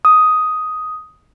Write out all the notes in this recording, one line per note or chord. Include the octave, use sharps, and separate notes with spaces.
D#6